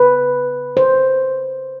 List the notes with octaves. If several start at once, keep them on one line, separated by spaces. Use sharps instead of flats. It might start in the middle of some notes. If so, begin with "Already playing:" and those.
Already playing: C#3 B4
C5